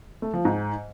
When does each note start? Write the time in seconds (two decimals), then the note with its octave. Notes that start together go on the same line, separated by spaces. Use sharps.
0.22 A3
0.34 F3
0.45 G#2